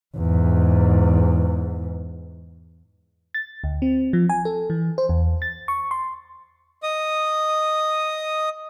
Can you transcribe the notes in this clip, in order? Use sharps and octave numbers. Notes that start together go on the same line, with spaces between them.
E2 G#2
A6
D2
C4
F3
G#5
A4
E3
C5
E2
A6
C#6
C6
D#5 D#6